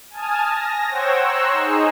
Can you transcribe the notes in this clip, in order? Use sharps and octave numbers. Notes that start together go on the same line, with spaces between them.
G#5 A5 D#6 F6
A#6
C5 C#5 F#5 G5 E6 G#6
A#5 C6 C#6 E6 F#6
D#4 G#4